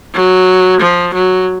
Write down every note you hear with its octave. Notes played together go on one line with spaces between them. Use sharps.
F#3
F3
F#3